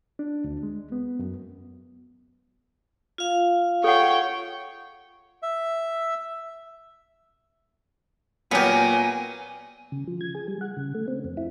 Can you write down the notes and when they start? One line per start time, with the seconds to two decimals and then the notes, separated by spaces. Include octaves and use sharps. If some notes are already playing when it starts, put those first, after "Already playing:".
0.19 D4
0.44 D2
0.63 G#3
0.92 B3
1.19 F#2
3.18 F4 F5
3.84 A4 C#5 F#5 G5
5.42 E5
8.51 A#2 F#3 B3 G4 A#4 G#5
9.92 C#3
10.08 F3
10.21 G#6
10.35 G#4
10.48 G3
10.61 F#5
10.77 C#3
10.95 A3
11.08 C4
11.24 F2
11.37 E4